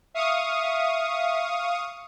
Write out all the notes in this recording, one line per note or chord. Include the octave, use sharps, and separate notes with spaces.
E5 F5 C#6 D#6